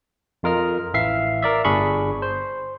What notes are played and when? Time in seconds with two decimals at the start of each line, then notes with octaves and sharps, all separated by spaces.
0.43 F2 F4 A#4 D#5 F6
0.94 A1 E3 E5 F5 C7
1.43 A#4 D5 E5
1.65 G1 D4 G#4 B5 C#6
2.22 C5